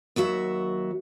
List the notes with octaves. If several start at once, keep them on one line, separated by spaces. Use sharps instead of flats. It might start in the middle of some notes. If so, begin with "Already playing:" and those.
D#2 F#3 F#4 E5